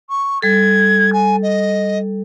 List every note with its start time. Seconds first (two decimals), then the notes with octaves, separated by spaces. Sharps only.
0.10 C#6
0.42 G3 A4 G#6
1.13 G#5
1.43 D#5